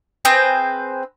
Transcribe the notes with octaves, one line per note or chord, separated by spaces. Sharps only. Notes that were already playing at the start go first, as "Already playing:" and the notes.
C4 G#4 B4 C5